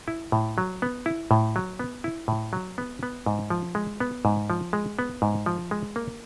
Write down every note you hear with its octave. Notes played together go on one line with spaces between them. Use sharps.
E4
A2
F#3
B3
E4
A2
F#3
B3
E4
A2
F#3
B3
B3
G#2
F3
G#3
B3
G#2
F3
G#3
B3
G#2
F3
G#3
A#3